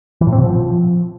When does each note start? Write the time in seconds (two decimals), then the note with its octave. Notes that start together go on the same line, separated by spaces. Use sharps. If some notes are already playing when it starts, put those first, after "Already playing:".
0.21 E3
0.27 A2
0.32 C4
0.38 B2
0.44 F3